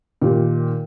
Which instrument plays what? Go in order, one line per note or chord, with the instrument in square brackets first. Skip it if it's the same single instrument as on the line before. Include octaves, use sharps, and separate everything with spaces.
[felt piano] A#2 D#3 G4